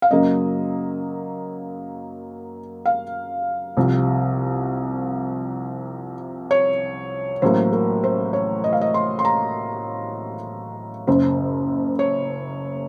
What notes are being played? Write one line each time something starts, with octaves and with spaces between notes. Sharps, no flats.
F5
F#2 C#3 F#3 A#3 D#5
F5
C2 C3 F3
C#5
A1 A2 F#3 A#3 C5
A#4
C5
C#5
D#5
F5
D#5
C6
C6
A#5
F#1 F#2 C#3 C5
C#5